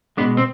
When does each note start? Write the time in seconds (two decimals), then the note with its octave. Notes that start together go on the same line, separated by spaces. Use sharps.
0.17 B2 G#3 B3 D4
0.37 C4